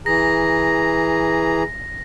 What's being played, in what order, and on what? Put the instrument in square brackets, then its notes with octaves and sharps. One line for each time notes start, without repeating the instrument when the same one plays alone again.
[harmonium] E3 G#4 A#5 [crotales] A#6